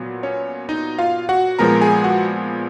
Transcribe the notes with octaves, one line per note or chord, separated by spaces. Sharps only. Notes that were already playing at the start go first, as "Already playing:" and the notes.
Already playing: A#2 F#3 B3
C#4 C#5
D#4 D#5
F4 F5
F#4 F#5
A#2 F3 G#3 B3 A#4 A#5
G#4 G#5
F#4 F#5